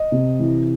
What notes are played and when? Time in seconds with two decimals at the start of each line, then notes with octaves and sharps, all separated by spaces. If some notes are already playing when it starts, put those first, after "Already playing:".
Already playing: D#5
0.12 C3
0.39 E3